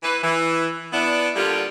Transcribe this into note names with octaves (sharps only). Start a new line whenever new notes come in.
E3 B4
E3
B3 D4 E4
D3 G3 A#3 F4 G4 A4